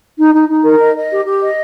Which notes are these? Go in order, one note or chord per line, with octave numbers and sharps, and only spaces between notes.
D#4
D#4
D#4
A#4
D#5
D#5
G4
G4
D#5